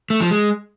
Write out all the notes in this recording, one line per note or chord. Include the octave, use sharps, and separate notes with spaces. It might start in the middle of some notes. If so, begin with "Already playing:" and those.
A3
F3
G#3